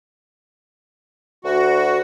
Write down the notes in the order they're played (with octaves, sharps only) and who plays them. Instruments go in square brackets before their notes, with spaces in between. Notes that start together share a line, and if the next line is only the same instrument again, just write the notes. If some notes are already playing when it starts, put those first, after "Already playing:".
[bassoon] D2 [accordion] F#4